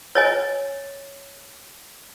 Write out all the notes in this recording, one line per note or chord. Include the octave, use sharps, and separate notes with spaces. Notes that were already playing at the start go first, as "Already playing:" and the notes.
C#5 D#5 G#5